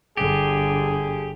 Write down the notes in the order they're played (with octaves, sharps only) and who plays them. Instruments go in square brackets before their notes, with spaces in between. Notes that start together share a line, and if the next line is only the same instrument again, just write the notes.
[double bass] G1 D3 [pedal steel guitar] G4 [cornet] G#4